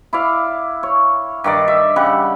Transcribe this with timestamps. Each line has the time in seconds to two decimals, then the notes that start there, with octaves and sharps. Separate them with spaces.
0.13 E4 D5 F5
0.83 C#5
1.44 G2 D#3 D5
1.68 E5
1.96 C#3 G3 F#5